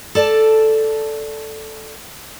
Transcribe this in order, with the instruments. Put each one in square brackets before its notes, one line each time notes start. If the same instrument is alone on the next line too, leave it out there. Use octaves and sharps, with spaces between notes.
[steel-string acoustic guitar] A4 D5 A5